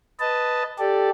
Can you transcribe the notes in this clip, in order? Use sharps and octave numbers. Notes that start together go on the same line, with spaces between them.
B4 D#5 A5
G4 A4 D5